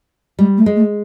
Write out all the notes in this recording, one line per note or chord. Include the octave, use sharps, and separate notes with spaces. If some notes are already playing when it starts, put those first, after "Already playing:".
G3 G#3
A3
G#3
A3